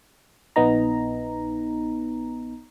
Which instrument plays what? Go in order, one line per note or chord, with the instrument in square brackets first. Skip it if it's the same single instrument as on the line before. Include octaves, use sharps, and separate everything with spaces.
[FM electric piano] A#1 B3 D#4 A#5